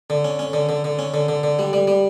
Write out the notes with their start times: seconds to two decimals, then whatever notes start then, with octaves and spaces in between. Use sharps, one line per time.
0.10 D3
0.24 C#4
0.39 C#4
0.53 D3
0.69 D3
0.84 D3
0.99 C#4
1.14 D3
1.28 D3
1.43 D3
1.59 G3
1.73 G3
1.87 G3